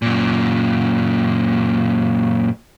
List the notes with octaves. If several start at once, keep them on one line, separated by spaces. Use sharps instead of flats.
F#2 A#2